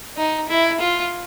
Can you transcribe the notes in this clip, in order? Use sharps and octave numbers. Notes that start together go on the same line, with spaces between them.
D#4
E4
F4